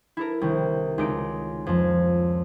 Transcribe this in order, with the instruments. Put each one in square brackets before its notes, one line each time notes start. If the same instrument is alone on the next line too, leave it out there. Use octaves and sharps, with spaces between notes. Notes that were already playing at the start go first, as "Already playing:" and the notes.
[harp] E4 A4 A#4
C2 D#3
C#2 D#4 D7
F2 F3